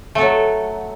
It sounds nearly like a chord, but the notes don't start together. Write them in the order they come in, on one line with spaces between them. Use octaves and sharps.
A3 A4 F#3